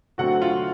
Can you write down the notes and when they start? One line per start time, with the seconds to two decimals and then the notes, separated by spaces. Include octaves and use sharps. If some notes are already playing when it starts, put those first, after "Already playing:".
0.18 D3 F#3 A3 C4 F#4 F#5
0.42 F4 F5